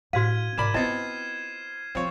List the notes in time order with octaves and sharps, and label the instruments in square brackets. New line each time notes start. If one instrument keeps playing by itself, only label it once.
[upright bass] A2 [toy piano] F#4 C5 F5 [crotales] F6 G#6 D#7
[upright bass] G#2 C#3 [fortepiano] A#4 D5 B5 [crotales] E7
[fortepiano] B3 C4 [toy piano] E4 D#5 [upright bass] F4 [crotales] G#6 C7 E7
[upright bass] F3 [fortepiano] C4 F4 C#5